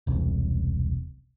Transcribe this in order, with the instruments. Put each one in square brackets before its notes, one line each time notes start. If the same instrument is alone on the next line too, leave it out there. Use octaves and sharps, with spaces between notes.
[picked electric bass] E1 C2